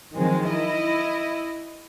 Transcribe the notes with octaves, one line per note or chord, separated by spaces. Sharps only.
D#3 F3 F#3 G#3 C4
E4 D#5